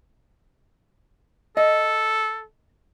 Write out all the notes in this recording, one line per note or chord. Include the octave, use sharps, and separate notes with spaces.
A4 D#5